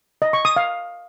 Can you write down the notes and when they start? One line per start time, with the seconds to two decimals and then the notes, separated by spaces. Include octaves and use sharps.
0.22 D#5
0.33 C#6
0.45 D#6
0.56 F5